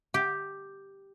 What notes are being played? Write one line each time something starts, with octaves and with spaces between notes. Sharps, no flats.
G4